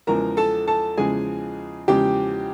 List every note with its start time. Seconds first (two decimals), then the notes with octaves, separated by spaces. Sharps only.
0.07 E2 C#3 F3 G#3 A#4 A#5
0.37 A4 A5
0.67 A4 A5
0.97 E2 C#3 F3 G#3 G#4 G#5
1.88 E2 C#3 F3 G#3 G4 G5